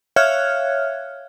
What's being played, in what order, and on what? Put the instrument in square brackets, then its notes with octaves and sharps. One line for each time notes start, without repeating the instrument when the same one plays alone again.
[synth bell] C#5 E5 F5 F6 F#6 G#6